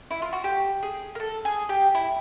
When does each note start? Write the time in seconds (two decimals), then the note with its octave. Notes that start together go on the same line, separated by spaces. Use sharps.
0.11 E4
0.22 F4
0.33 F#4
0.44 G4
0.83 G#4
1.15 A#4
1.20 A4
1.45 G#4
1.69 G4
1.95 E4